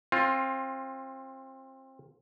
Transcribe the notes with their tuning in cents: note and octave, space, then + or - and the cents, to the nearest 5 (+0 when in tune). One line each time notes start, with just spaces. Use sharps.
C4 +25 F4 +10